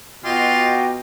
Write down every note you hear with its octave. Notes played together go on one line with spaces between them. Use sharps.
B2 F4 F#4 D#5 G5 D6